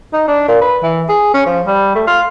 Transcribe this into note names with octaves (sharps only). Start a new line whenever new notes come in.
D#4
D4
A#2
B4
E3
G#4
C#4
F3
G3
A3
F4